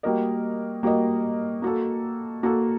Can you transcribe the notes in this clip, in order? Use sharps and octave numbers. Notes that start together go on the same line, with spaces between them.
G3 A#3 F#4 A#4 D#5
G3 A#3 F#4 A#4 D#5
A#3 F#4 A4
A#3 F#4 A4